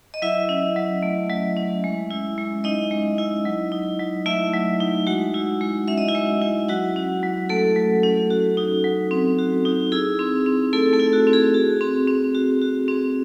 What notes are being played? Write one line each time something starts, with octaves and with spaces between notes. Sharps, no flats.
D#5
F#3 E4 E5
C#4
F#3
A3
F#3
C#4
G#3
E4
G#3
C#4 D#4 D#5
G#3
E4
F#3
D#4
F#3
A3 E4 E5
F#3
D#4
G#3 F#4 F#5
E4
G#3
C#4 E5
D#5
E4 E5
G#3
E4
F#3 F#4 F#5
C#4
F#3
A3 A4
F#3
C#4
F#4
D#4
F#3
C4
F#4
D#4
E4 G#4
C4
C4
A3 E4 A4
A3 A4
E4
F#4
C4
G#4
F#4
C4
C4
F#4
F#4
C4